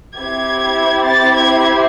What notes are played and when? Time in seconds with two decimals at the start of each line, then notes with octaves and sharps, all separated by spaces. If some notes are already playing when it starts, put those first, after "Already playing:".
0.17 C4 E4 G4 G#6
1.07 A6
1.37 G#6